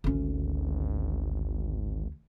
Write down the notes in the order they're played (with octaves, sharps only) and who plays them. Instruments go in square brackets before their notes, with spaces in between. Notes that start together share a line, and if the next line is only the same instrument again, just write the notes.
[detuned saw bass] G#1 [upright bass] D2 C#4